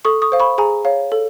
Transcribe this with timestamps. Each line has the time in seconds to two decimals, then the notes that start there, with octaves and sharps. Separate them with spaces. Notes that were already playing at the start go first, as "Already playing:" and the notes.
0.05 A4 C#6 D#6
0.22 C#6 D#6
0.32 C5 F5
0.40 B5 C#6
0.58 G#4 G#5 A#5
0.85 C#5 F5
1.12 A4